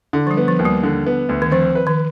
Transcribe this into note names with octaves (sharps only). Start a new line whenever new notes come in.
D3
F3
G3
B3
F3
D#2
G3
D3
B3
D2
D#3
F3 C4
B4
D#3